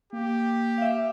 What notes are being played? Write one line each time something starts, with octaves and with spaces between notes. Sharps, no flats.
A#3 G4
E5 F5